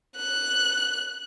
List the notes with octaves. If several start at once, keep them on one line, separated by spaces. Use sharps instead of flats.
F#6